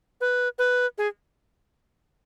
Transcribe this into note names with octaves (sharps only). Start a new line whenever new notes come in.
B4
B4
G#4